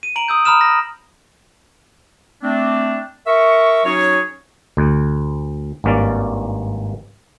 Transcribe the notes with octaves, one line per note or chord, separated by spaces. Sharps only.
D#7
A#5 D7 F#7
D#6 E6 G6
A#5 B5 D#6 F6 E7
A#6
A3 C4 D4
A#4 E5 C#6
F#3 C#4 D#4 F#4 G#4 C#5
D2
G#1 G2 A#3 C#4 D5